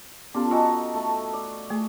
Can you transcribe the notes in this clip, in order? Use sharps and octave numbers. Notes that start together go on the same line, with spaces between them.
B3 C#4 F4 G4 A4 D5
D#4 F4 F#4 A4 D#5 G#5
A3
D5
A3 G#4